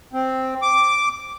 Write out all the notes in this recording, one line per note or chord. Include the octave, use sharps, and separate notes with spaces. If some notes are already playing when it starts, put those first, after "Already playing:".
C4
D6